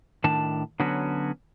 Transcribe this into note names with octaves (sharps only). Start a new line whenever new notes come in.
A2 D#3 D4 A5
D3 F#3 B3 C#4 F#4